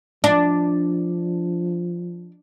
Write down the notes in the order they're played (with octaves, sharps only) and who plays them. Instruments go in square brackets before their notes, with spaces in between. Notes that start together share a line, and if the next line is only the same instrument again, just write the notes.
[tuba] F3 [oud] D4